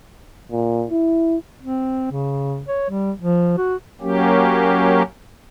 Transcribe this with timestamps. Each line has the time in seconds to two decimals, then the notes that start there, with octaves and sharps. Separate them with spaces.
0.51 A#2
0.91 E4
1.62 C4
2.12 C#3
2.68 C#5
2.90 G3
3.20 F3
3.58 F#4
4.01 F#3 A#3 C#4 G4